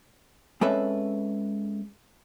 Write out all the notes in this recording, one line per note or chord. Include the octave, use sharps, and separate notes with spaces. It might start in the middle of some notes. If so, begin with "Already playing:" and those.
G#3 C4 C#4 A4 B4 E5